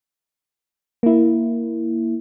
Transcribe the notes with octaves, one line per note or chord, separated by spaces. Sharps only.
A#3 E4